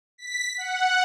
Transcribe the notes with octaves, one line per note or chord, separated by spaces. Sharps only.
B6
F#5